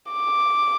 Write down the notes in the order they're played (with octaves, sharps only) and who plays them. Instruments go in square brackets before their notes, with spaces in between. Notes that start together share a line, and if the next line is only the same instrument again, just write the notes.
[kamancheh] D6